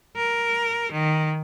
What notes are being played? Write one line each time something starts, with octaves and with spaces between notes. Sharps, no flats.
A#4
D#3